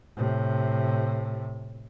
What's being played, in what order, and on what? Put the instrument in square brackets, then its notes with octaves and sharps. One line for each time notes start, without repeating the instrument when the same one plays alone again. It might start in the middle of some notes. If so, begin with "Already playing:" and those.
[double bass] A2 C3